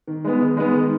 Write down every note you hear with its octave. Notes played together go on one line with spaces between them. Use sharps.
D#3
G#3 B3
D#3
G#3 B3
D#3